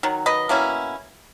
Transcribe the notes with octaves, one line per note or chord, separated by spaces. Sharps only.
D#3 F#3
B4 D#5
B2 A#3 C#4 E4